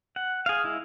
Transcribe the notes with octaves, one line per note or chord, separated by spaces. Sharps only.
F#5
G#4 F5
G#3 E4